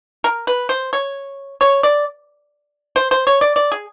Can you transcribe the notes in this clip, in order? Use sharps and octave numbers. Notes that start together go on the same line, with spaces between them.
A#4
B4
C5
C#5
C#5
D5
C5
C5
C#5
D5
D5
G#4